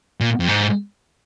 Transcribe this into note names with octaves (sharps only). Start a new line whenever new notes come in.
A#2
F2
G#2